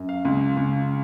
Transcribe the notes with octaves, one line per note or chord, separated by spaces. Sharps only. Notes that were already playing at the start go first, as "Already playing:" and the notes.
Already playing: F#2
F5
C#2
C#2